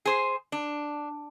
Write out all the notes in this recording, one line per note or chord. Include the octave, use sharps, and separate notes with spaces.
G#4 C5
D4